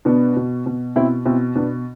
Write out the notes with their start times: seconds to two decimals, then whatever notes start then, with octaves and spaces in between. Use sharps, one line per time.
0.05 B2 B3 D4
0.36 B2
0.66 B2
0.96 B2 C4 E4
1.25 B2 C4 E4
1.55 B2 B3 D4